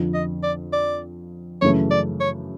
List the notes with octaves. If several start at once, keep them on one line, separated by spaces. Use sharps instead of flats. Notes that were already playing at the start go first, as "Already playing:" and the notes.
Already playing: F2 D3 F3
D#5
D5
D5
F#2 C#3 E3 A3 C#5
D5
C#5